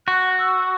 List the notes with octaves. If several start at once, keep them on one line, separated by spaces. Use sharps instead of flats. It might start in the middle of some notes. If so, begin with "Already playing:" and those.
F#4 F#6
E6